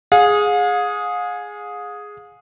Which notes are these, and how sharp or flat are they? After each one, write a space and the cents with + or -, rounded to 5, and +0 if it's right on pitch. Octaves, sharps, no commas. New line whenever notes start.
G#4 +0 F5 +45